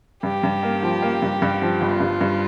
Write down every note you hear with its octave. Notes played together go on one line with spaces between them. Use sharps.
G2 G4
G2
A#3
F3
A#3
G2
G2
F3
G1 F4
G2
G2